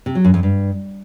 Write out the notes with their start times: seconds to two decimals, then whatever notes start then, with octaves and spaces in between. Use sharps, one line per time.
0.06 C3
0.15 F#3
0.25 F#2
0.34 F2
0.43 G2